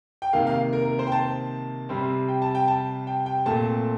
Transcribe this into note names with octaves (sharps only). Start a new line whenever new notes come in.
G5
C3 D#3 A#3 F5
F5
A#4
A#4
C5
G5
A5
C3 G3 C4
G5
A5
G5
A5
G5
G5
A#2 A3 C4 A5